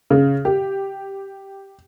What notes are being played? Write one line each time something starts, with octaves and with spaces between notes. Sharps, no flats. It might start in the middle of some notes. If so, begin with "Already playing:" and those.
C#3
G4